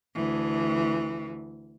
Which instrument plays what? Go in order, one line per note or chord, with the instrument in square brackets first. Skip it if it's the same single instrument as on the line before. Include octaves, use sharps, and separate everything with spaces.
[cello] D2 E3